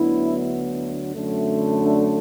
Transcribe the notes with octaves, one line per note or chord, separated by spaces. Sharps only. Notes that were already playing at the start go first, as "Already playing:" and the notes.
Already playing: D2 D3 F#3 B3 E4
F#2 D3 F#3 A3
D4